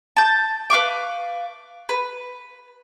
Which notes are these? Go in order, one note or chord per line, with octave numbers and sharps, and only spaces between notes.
A5 G6
B4 F5 C#6 D6
B4